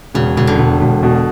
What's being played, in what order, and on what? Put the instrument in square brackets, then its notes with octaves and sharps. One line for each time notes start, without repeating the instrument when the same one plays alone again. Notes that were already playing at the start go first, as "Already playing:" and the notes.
[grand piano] E1 [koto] C#3
[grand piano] E1 [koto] C#3
[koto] D3
[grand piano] E1
E1
B2